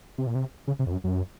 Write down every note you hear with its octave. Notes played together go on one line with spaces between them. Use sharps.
C3
A#2
C3
C#3
C3
F2
F#2
F#2